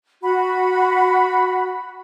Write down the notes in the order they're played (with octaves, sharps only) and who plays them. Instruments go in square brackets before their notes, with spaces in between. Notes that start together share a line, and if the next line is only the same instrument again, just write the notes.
[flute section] F#4 B5